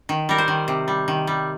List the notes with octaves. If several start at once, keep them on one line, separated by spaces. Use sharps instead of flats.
D#3
G3 A#4
C5
D#3
C3
G3
D#3
G3